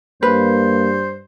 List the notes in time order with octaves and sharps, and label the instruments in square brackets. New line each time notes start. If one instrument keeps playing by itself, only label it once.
[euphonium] G2 [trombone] A#3 [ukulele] B4 [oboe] C5